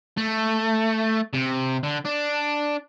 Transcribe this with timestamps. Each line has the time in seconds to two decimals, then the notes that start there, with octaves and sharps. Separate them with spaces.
0.17 A3
1.34 C3
1.83 D3
2.05 D4